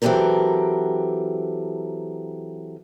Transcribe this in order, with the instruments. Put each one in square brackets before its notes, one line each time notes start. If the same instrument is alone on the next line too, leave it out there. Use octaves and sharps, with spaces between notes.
[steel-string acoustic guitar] E3 F#3 C4 G4 A4 A#4